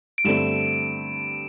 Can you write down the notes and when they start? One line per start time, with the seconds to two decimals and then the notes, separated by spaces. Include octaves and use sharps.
0.18 D7
0.24 G2 D3 A3 C4 E7